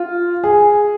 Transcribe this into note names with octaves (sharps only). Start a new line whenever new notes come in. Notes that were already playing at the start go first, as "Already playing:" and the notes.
Already playing: F4
G#4